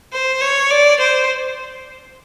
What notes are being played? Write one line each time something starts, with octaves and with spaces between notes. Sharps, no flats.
C5
C#5
D5
C5